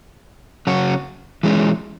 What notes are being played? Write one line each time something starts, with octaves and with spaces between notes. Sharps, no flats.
C#3 F#3 C#4 F#4
E3 G#3 C#4